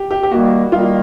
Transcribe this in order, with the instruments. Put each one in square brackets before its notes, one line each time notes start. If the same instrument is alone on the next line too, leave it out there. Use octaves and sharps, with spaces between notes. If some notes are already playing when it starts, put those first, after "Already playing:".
Already playing: [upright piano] G4
G4
G4
[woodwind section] D#3 G3 A#3 [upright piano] F#4
[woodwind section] D#3 G3 A#3 [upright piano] F4